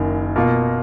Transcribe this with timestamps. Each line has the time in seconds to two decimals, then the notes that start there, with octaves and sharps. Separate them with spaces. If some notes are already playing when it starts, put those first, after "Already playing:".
Already playing: F#1 F#2 D#3
0.36 B2 A#3 F4